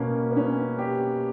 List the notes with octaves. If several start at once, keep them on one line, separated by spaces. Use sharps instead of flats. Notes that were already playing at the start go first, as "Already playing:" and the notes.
Already playing: B2 A#3 B3 C#4
B3
C#4
G4